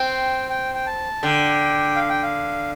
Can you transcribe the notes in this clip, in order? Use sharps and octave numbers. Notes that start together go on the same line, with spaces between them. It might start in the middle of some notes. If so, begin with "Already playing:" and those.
Already playing: C4 G5
G5
G5
A5
D3 G5
F5
G5
F5